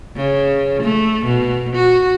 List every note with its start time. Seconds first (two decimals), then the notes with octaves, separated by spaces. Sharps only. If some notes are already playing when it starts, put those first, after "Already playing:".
0.17 C#3
0.83 A3
1.25 B2
1.76 F#4